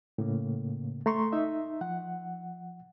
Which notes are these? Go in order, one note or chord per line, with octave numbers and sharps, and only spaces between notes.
A2 C#3 A#3
A3 A#5 C6 C#6
D#4 E5
F3 F#5